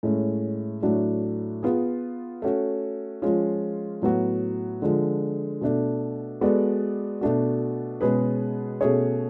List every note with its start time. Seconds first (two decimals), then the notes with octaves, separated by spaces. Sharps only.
0.03 A2 G#3 C#4
0.82 A2 F#3 A3 D4 F#4
1.63 B3 F4 G#4
2.42 A3 C#4 F#4
3.22 F3 G#3 C#4 F4
4.02 A2 F#3 B3 F#4
4.82 D3 F3 G#3
5.61 B2 A3 D4
6.41 G#3 B3 F#4 A4 D5
7.21 B2 A3 D4 F#4
8.01 B2 G#3 C#4 G#4 B4
8.81 B2 A3 C#4 G#4 C#5